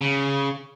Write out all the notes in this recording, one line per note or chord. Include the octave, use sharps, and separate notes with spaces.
C#3